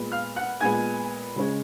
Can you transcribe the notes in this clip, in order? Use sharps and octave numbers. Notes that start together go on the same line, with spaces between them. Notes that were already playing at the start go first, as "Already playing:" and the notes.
Already playing: A#2 G#3 B3
F5 F6
F#5 F#6
A#2 G#3 B3 G#5 G#6
C#3 G#3 C#4